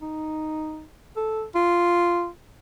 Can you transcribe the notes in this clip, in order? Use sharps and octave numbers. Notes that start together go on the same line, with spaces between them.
D#4
A4
F4